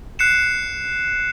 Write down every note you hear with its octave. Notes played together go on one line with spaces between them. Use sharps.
F#6 C7 C#7 E7